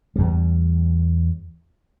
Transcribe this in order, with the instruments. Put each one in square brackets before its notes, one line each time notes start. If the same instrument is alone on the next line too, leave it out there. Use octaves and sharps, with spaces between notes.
[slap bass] E2 G3